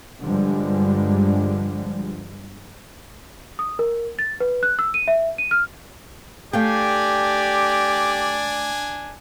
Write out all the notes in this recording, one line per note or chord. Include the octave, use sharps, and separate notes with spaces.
G2 D3 F3 G3 G#3
D#6
A#4
A6
B4
F#6
E6
D#7
E5
D#7
F6
A3 D4 G4 D5 F5 G5 G#5